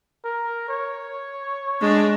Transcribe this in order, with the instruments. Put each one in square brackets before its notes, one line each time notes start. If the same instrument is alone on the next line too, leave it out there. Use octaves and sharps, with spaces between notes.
[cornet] A#4
C#5
[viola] G#3 D4